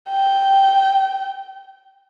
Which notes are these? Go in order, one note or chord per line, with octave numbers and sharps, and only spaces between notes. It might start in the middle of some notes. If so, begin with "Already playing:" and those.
G5